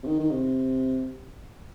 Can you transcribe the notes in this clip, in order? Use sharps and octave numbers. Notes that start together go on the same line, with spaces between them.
C3
D#3
D#3
C3